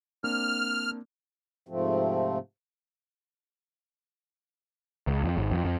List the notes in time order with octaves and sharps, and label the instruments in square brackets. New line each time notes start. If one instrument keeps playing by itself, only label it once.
[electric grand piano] A#3 C4 D4 [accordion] F6
[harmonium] G#2 C3 F3 A3 C4
[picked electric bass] C#2
F2
G#1
F2
F2